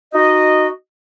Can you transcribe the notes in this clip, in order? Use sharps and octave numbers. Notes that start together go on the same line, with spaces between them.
D#4 F#4 D#5